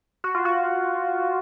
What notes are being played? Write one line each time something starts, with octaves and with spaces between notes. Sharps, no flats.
F#4
F4
F#4